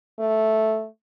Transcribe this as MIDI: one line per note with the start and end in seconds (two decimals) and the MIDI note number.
0.19 0.87 57